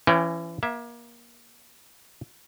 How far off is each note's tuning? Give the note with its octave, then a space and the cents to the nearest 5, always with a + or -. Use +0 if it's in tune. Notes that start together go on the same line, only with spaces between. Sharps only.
E3 +30 C#4 +0 G5 +0
A#3 +30 E5 +0